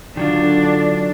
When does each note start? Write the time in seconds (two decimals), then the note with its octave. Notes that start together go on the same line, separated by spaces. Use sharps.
0.17 D3 D#3 F#3 D4 F4